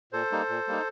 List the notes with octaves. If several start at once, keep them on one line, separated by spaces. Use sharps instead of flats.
A#2 A4 C5
G3 A#3 D#4
A#2
G3 A#3 D#4